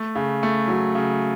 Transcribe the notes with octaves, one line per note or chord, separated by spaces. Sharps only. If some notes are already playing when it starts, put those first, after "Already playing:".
Already playing: A3
C#3
A3
F#3
C#3